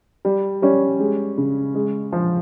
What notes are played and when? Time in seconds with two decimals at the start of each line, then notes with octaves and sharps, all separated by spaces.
0.25 G3
0.62 G3 C#4
1.00 G#3
1.38 C#3
1.75 G#3
2.13 F3